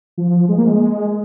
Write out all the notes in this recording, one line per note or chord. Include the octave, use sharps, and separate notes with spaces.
F3
G#3
A#3
G#3